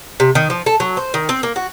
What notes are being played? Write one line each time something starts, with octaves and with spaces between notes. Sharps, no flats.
C3
D#3
F3
A4
F#3
C5
D#3
C4
A#3
F#4